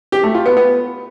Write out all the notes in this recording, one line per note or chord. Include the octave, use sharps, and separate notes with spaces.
G4
A3
F4
B3
B3